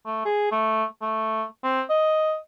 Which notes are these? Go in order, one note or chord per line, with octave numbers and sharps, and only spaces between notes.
A3
G#4
A3
A3
C4
D#5